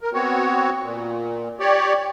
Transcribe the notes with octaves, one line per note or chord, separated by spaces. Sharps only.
A#4
B3 C4 F#4 C#5
A#2
G4 C#5 D5